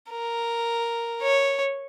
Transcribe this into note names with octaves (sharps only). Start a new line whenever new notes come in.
A#4
C#5